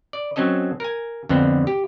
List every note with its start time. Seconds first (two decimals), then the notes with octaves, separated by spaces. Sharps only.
0.13 D5
0.36 F#3 C4 C#4 A4 D#5
0.80 A#4 G#5
1.29 F2 D3 B3 C4
1.67 G4